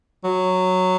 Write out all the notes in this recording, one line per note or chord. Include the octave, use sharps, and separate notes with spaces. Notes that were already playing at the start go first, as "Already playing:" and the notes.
F#3